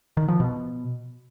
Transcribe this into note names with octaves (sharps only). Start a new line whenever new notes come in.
D#3
F3
B2